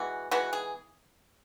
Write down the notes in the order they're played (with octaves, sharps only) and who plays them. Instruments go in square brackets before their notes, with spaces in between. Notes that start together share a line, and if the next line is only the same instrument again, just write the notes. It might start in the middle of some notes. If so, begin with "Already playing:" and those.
Already playing: [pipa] E3 G#3 B3 F#4
E3 G#3 B3 F#4
G#4